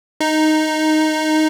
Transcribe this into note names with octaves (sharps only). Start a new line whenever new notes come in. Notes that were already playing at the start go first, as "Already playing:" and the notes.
D#4